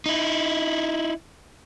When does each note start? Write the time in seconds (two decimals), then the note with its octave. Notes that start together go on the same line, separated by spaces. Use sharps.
0.06 D#4 E4